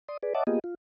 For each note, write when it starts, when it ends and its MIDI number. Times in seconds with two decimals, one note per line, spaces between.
0.08 0.17 74
0.08 0.17 84
0.08 0.17 87
0.23 0.33 68
0.23 0.33 71
0.23 0.33 74
0.35 0.44 73
0.35 0.44 75
0.35 0.44 76
0.35 0.44 78
0.35 0.44 81
0.35 0.44 86
0.47 0.59 58
0.47 0.59 59
0.47 0.59 65
0.47 0.59 67
0.47 0.59 68
0.47 0.59 75
0.64 0.74 65